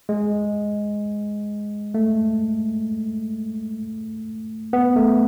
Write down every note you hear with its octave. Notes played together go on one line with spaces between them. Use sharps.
G#3
A3
B3
A3